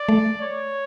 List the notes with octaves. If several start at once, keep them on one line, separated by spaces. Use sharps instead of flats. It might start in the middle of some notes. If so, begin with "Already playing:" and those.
Already playing: D5
A3
C#5